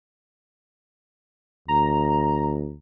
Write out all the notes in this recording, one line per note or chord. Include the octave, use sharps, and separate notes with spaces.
D2 A#5